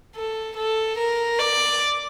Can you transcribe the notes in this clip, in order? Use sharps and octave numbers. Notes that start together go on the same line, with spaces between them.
A4
A4
A#4
D5